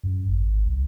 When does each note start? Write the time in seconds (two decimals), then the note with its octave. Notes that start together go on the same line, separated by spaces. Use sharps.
0.03 F#2
0.28 G#1
0.66 C2